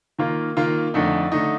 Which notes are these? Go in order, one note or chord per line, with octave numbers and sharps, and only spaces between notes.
D#3 A#3 F4
D#3 A#3 F4
F2 D3 A3 D#4
D3 A3 D#4